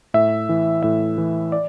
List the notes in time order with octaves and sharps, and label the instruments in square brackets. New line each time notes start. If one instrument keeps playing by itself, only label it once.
[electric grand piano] A2 E5
E3
A2 E5
E3
D5